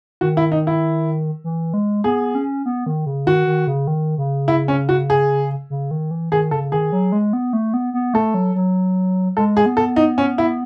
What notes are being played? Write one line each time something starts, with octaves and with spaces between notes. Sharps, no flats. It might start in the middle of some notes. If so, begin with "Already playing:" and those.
D#3 F#4
E4
D#4
E4
E3
G#3
B3 G#4
C#4
B3
D#3
C#3
D#3 F#4
D#3
C#3
D#3
C#3
E4
C#4
F#4
G#4
C#3
D#3
E3
D#3 G#4
C#3 A4
D#3 G#4
F#3
G#3
B3
A3
B3
B3
A3 A4
F#3
F#3
G#3 A4
G#4
B3
A4
D#4
C#4
E4